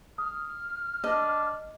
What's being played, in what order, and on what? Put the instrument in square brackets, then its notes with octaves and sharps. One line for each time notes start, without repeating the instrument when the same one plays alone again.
[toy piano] D#6 [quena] F6
[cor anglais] D4 [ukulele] D#5